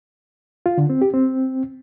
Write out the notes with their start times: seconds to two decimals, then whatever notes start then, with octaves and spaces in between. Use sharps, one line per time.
0.66 F4
0.78 D3
0.90 C4
1.02 G4
1.13 C4